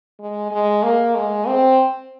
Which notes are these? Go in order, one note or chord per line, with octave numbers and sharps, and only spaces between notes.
G#3
G#3
A#3
G#3
C4